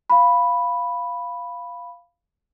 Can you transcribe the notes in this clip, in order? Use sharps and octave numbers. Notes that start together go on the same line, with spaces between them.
F5 B5